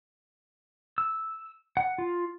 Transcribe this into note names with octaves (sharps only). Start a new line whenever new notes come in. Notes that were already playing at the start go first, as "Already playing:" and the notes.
E6
F#5
F4